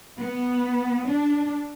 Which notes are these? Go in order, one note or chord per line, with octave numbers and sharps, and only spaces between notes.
B3
D4